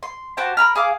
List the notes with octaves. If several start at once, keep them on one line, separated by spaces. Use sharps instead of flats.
C6
F#4 G4 C5 A5
A#4 A#5 B5 F6
G#4 F5 D6